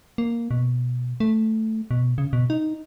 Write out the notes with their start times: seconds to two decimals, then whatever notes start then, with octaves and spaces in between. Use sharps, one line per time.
0.18 A#3
0.51 B2
1.20 A3
1.91 B2
2.18 C#3
2.33 B2
2.50 D#4